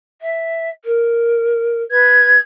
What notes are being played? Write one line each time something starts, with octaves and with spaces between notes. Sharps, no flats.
E5
A#4
B4 G#6